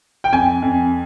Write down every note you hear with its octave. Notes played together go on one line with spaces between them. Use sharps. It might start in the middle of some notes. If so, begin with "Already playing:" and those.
G5
F2 G#5
F2